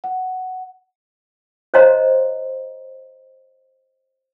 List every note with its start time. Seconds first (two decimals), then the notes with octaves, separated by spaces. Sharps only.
0.04 F#5
1.74 C5 C#5 D#5 F5 A#5 C6